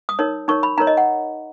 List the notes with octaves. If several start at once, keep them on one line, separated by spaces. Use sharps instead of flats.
D#6
D#4 A#4 C#5
D#4 A#4 C#5 C#6
B5
D#4 A#4 C#5 A#5
D#5
F#5